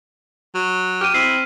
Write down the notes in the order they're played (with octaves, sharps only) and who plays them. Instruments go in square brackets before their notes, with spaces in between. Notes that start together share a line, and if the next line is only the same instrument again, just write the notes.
[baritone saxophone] F#3
[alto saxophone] G4 [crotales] F6 D#7
[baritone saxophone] C4 [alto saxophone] E4 [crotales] B6 C7